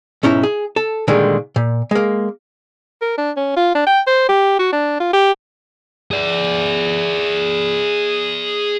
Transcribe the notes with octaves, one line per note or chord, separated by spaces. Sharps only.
B1 G#2 C#4 D#4 E4
G#4
A4
A#2 D3 D#3 G3 G#3
A#2
G#3 A#3
A#4
D4
C#4
F4
D4
G5
C5
G4
F#4
D4
F4
G4
G#4 D5